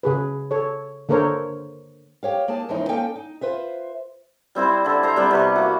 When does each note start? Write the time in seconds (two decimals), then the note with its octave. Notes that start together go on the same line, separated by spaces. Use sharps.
0.03 C#3 G#4 B4
0.51 A4 C#5
1.09 D3 A#3 A4 A#4 C5 C#5
2.23 G4 C#5 F5
2.48 A#3 D#4 G#4 A5
2.69 D#2 E3 F3 G#3 C#4 D#4
2.89 A#3 C#4 D#4 A4 F5 G5
3.16 D#4
3.41 F4 B4 C5 E5
4.55 G3 C4 E4 C5
4.84 D3 E4
5.03 C5 E5 A#5
5.16 G3 B3 C4
5.31 C3 B4 C#6
5.56 A#3 F#4